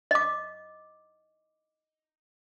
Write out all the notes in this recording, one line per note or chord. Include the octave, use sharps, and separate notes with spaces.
D#5 D6